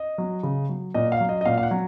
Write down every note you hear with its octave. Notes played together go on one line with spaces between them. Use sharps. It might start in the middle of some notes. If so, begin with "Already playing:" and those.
Already playing: D#5
F#3
C#3
F#3
A#2 D#5
F5
F#3
D#5
D#5
A#2 F5
F5
F#5
F#3